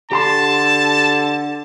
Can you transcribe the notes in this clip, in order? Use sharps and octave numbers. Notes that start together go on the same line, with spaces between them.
D3 G4 A5 A#5 C6